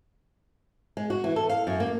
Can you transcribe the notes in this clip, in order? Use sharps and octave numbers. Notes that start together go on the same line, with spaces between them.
G#3
F#4
E3
A4
F5
F#2
A#3